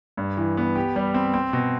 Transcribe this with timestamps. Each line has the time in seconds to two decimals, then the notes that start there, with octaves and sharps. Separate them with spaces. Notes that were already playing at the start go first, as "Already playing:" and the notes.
0.17 G2
0.37 E3
0.57 B3
0.76 G4
0.96 G3
1.14 C4
1.34 C4
1.53 B2